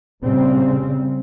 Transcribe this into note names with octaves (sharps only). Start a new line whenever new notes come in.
A#2 C#3 G3 C4